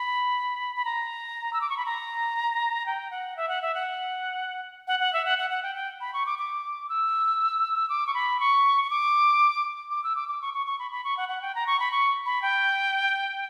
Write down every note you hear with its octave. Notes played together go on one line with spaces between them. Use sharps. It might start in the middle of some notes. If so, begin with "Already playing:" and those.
Already playing: B5
B5
A#5
E6
D6
C#6
B5
A#5
G5
F#5
E5
F#5
E5
F#5
F#5
F#5
E5
F#5
F#5
F#5
G5
G5
B5
C#6
D6
D6
E6
D6
C#6
B5
C#6
C#6
D6
D6
E6
D6
D6
C#6
C#6
C#6
B5
B5
C#6
F#5
F#5
G5
A#5
C#6
B5
C#6
B5
G5